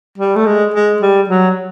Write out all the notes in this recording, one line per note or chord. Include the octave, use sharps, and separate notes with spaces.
G3
A3
G#3
G#3
G3
F#3